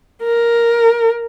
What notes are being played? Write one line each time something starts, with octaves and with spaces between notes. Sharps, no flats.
A#4